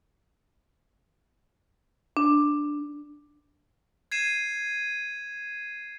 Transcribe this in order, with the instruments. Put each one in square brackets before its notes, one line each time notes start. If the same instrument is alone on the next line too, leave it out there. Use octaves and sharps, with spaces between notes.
[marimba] D4
[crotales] G#6 C7 D#7 E7